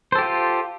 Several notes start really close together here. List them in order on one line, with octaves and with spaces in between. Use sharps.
C5 A4 G4 F4